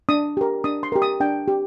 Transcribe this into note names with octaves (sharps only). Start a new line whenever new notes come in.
D4 D#6
G4 A#4
D4 D#6
C6
G4 A#4
D#6
D4 G5
G4